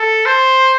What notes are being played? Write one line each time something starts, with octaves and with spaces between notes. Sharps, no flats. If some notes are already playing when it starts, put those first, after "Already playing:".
Already playing: A4
C5